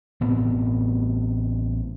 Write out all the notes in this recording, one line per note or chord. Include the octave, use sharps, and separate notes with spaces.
A1 A2 B3 C4